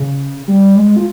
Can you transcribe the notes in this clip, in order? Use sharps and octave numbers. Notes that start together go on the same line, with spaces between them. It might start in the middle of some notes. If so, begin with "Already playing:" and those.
Already playing: C#3
G3
G#3
F4